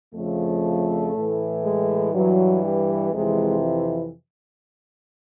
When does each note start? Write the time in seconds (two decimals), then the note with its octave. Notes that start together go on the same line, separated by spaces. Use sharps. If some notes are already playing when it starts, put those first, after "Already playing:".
0.14 F2 C#3 F3 A3
1.14 A2 E3
1.64 G#3
2.14 G2 E3 F#3
2.63 G3
3.13 F2 C3 E3 G#3